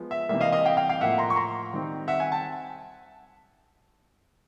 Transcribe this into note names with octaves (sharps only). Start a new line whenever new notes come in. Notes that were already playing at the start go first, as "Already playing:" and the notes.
Already playing: F3 G#3 B3
E5
C3 E3 G3 A#3 E5
D#5 F5
D#5 F5
F5 G5
F5 G5
F5 G5
A2 F3 A#3 E5 F#5
A#5 C6
C#6
A#5 C6
D#3 G3 C4 D#4
E5 F#5
F#5 G#5
G5 A5